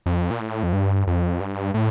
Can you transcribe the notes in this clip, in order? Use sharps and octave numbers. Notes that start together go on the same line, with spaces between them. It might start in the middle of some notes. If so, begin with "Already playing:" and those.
F2
A#2
A2
F2
G2
F2
G2
A2